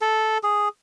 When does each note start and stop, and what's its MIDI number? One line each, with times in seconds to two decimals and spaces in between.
0.01 0.38 69
0.43 0.68 68